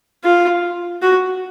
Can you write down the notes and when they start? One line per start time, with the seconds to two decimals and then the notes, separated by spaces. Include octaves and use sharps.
0.24 F4
1.02 F#4